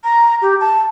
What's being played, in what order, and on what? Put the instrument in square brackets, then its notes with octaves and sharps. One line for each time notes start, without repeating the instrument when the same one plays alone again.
[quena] A#5
G4
A5